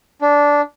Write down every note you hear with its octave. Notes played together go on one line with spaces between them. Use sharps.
D4